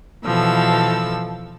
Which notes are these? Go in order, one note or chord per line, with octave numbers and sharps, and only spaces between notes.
B2 E3 F3 A4 E6